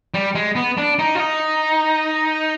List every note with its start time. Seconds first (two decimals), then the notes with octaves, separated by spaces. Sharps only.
0.14 G3
0.35 G#3
0.56 B3
0.78 D4
0.99 D#4
1.15 F4
1.20 D#4